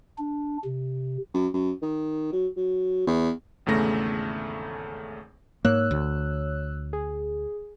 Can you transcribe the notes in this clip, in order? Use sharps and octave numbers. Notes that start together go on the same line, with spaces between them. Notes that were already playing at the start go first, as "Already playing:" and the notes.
D4
C3
F#2
F#2
D#3
F#3
F#3
E2
G#1 E2 C#3 A3 A#6
G#2 A#3 C#5 E6 F#6
D2
G#4